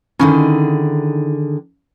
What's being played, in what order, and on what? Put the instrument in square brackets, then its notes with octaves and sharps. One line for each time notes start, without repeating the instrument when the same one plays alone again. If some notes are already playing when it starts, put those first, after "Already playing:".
[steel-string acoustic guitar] D3 D#3 G#4 [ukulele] C#4 D#4 E4